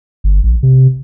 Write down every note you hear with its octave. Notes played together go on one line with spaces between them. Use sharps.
G1
A#1
C3